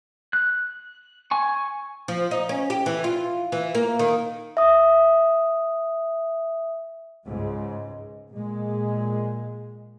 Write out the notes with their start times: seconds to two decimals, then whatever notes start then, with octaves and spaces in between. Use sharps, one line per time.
0.33 F#6
1.31 G#5 C#6
2.08 F3
2.31 D#4
2.49 C#4
2.70 G4
2.86 E3
3.04 F4
3.52 E3
3.75 A#3
3.99 D#3
4.57 E5 D#6
7.26 C#2 G#2 G#3
8.31 A#2 G#3